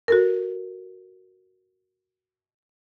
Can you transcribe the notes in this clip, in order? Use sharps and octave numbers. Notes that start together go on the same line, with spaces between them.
F#4 A4 A#4